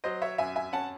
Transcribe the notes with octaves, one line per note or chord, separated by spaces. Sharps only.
F#3 C5 D#5
C#5 E5
F#2 E5 G#5
E5 G#5
C#4 F#5 A5